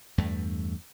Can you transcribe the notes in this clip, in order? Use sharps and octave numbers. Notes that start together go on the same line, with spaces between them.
E2 G2 A3